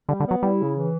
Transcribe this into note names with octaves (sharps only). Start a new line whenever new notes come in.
D3 G3
D3
B3
F#3
G3 E4
C#3
E3